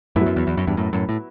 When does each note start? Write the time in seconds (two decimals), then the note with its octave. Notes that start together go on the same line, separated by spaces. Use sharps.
0.16 F#2 A2 F#3 B3 E4
0.26 F#2
0.36 E2
0.47 E2
0.57 F#2
0.67 E2 G2
0.77 F#2 A2
0.93 F#2 A2
1.09 A2